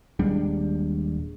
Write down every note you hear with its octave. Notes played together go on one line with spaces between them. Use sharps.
D#1 G3 G#3 D4